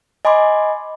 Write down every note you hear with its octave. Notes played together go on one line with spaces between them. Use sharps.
D#5 G#5 B5 C6 D6